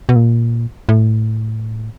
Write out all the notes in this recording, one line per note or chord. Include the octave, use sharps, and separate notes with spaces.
B2
A#2
A2